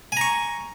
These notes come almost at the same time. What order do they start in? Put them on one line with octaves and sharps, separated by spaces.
G#5 A#5 C#6